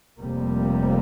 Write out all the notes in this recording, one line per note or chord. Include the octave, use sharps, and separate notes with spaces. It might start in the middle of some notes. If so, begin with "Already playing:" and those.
F1 F2 C3 G3 A#3